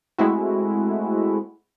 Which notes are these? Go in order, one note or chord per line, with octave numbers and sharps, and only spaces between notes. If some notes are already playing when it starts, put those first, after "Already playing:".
G#3 A3 C4 E4 F#4